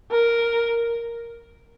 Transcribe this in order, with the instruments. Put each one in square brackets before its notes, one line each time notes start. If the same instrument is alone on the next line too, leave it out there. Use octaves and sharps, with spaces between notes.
[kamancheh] A#4